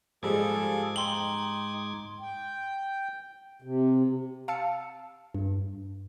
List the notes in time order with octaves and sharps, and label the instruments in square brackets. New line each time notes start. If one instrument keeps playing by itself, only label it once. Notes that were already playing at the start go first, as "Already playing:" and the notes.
[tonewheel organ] G#2 D6 G#6 [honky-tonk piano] F3 G3 G#3 [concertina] G#4 A4
[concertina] D#4 D#6 [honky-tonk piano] G5 F#7 [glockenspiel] C6 G7
[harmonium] G5
C3
[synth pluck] F5 A5 E6 C#7
G2